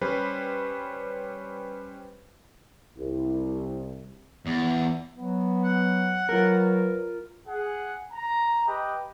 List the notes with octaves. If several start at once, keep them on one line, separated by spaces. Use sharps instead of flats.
G3 C#4 B4 C5
C2
E2
F#3 B3
F#5
F#3 F4 A#4 B4
G#4 F#5
A#5
G4 B4 D#5 G5